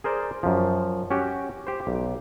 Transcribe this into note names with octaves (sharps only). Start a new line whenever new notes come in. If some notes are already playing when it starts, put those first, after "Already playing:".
G#4 A#4 C5 D5
F#2 F3
C#4 F#4 G4
G4 C5
B1